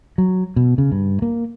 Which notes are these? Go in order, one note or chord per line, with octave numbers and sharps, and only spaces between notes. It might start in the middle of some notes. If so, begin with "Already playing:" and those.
F#3
B2
C#3
G2
A#3